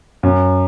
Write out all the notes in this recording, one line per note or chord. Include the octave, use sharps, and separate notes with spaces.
F#2